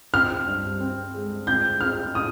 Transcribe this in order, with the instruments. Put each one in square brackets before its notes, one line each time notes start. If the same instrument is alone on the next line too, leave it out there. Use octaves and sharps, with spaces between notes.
[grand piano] C4 [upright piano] F6
[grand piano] G2
C4
G#3
[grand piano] C4 [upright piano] G6
[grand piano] C4 [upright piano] F6
[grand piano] C4 [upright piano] D#6